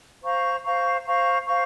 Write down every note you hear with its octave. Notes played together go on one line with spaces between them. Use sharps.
C5 F5 A#5 C#6
C5 F5 A#5 C#6
C5 F5 A#5 C#6
C5 F5 A#5 C#6